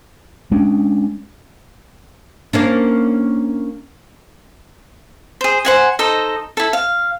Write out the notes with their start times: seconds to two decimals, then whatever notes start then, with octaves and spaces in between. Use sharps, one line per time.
0.51 G#3 C#4 D4
2.53 A#3 C#4 D4
5.41 G#4 C5
5.65 C5 F#5 G#5
5.99 D#4 A4 C5 D#5
6.57 E4 A4
6.73 F5